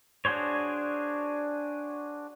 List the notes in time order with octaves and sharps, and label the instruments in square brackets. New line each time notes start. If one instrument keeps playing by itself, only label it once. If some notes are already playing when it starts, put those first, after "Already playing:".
[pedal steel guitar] D4 F#4 G#4 C5 C#5